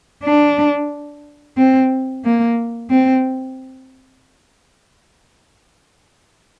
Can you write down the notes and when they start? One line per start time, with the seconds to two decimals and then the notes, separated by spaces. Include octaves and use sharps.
0.23 D4
1.57 C4
2.24 A#3
2.90 C4